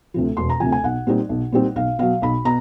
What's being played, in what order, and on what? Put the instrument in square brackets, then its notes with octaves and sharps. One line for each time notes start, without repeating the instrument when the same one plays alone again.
[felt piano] D2 C3 F3
E1 C6
A#5
D2 C3 F3 G#5
G#5
B1 F#5
A#2 G3 C4 D#4
B1
A#2 G3 C4 D#4
B1 F5
B2 F#3 F5
B1 B5
B2 A#5